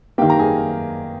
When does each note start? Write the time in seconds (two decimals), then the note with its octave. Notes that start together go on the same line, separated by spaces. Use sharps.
0.18 D#3 A#3 G4 G5
0.30 A#5
0.39 G#4 G#5